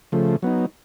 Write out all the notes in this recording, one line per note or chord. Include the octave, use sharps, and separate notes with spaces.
C#3 F3 A3
F#3 B3 D#4